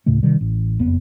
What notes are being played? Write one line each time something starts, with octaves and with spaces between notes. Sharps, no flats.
D2 A2 C#3 A3
C3 D#3 G3
A1
F#1 F2 B3